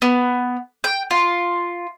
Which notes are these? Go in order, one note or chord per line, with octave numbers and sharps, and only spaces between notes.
B3
G5
F4